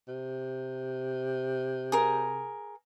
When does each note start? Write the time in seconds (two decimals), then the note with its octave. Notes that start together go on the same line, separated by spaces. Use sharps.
0.08 C3
1.92 G#4 A#4